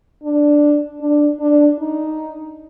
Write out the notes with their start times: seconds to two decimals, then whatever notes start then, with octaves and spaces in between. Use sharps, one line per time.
0.24 D4
1.01 D4
1.40 D4
1.79 D#4